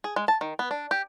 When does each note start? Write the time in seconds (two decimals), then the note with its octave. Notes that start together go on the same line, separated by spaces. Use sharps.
0.04 G#4
0.16 G#3
0.28 A5
0.41 D#3
0.59 B3
0.71 D4
0.91 G4